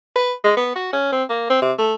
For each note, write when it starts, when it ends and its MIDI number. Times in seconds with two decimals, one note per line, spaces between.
0.16 0.33 71
0.44 0.53 56
0.57 0.72 59
0.76 0.91 66
0.93 1.11 61
1.12 1.23 60
1.29 1.46 58
1.50 1.62 60
1.62 1.73 48
1.78 1.94 57